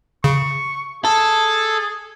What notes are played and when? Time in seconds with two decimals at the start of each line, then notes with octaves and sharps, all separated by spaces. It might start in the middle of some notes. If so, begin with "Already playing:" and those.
0.24 C#3 C#6
1.05 G#4 A4